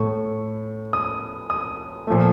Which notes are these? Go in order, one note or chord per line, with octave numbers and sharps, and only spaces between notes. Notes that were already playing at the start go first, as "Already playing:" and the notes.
Already playing: A2 A3 C#6
D#6
D#6
A#2 F3 A3